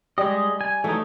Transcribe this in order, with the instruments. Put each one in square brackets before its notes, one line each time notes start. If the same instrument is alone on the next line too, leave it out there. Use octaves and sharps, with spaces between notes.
[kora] G3 [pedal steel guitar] G#3 D#5
[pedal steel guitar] G#5
[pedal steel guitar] E3 F#3 D#4 [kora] A3